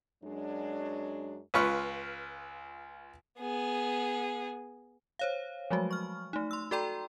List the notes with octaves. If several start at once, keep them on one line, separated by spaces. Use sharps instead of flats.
F#2 F#3 G#3 C#4 D4
C#2 F4 B4 C#6 F6
B3 G#4
C5 C#5 F5
F3 F#3 G#3 A3 F#4
C#6 F6
A3 D#4
C6 E6
F#4 A4 D5 G5 A#5 C6